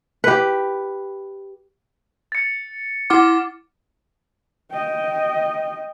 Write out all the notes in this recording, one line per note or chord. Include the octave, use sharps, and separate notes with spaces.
G4 B4
A6 C#7
E4 F#5 D6 F6
D#5 G5